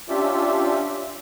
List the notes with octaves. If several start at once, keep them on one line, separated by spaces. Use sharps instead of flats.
C#4 D4 F4 G4 E5